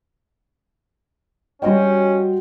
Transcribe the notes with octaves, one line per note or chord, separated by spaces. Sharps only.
G3 C#4 F#4 C5 D#5 G5